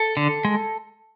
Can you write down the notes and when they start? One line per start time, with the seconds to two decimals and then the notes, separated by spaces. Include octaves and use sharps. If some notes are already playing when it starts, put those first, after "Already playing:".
Already playing: A4
0.17 D3
0.45 G#3